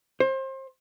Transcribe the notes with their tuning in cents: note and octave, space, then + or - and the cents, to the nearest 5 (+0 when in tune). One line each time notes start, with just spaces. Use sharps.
C5 +30